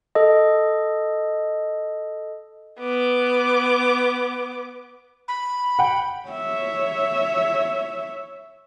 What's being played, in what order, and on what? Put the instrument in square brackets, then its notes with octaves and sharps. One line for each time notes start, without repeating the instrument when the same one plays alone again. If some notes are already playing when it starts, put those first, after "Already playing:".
[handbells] A4 D#5
[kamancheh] B3 D6
[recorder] B5
[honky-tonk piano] F#5 G5
[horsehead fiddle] C#5 E5